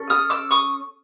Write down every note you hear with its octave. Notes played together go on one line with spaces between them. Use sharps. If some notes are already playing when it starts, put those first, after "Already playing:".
Already playing: C#4 A4
D#6 F6
D6 E6
C#6 D#6